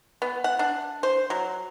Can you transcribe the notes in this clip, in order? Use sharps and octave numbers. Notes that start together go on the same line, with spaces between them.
B3
F#5
D4
C5
F#3